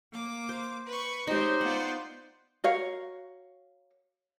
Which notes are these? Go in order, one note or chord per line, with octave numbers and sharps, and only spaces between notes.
A#3 D6
C5
B4 C#6
G#3 C4 D#4 G4 C5 C#5
B3 F4 D5 F#5
F#4 A#4 C#5 F5